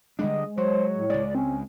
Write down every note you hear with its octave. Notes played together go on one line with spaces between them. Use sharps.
D3 G3 G#3 D4 D#5
F#3 C5 C#5
A2
C#2 G#3 D5
C4 C#4